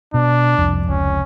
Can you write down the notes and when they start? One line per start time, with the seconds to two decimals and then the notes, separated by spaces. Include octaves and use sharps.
0.14 B2 D4
0.58 C2 F2
0.88 F1 C#2 C#4